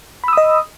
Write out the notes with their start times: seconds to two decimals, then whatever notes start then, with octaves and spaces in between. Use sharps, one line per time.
0.24 B5
0.28 E6
0.33 D#6
0.37 D#5